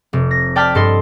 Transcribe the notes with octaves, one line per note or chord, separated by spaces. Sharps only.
F1
A#6
D5 G5 A5 F6 G6 B6
G2 A4 D#5 C6